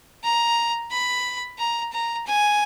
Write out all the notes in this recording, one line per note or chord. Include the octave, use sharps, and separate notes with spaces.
A#5
B5
A#5
A#5
G#5